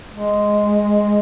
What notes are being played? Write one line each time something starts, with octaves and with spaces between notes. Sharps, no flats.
G#3